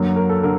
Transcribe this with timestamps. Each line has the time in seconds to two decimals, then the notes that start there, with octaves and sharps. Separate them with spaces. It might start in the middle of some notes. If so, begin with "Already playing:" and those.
Already playing: F#2 D3 F#3 A#3
0.16 A#4
0.29 A4
0.43 D3 A#4